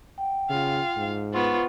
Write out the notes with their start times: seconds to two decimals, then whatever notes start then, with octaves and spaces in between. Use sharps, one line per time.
0.18 F#5 G5
0.49 C#3 F4 F5
0.97 G#2
1.33 B3 F4 C5 F#5 C#6